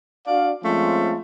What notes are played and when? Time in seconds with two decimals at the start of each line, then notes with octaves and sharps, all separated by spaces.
0.28 D4 F#4 D5 F5
0.64 F3 G#3 A3 C4 C#4 F4